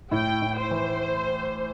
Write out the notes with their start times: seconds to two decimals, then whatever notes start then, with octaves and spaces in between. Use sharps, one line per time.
0.11 A2 G5
0.42 A2
0.57 C5
0.71 E3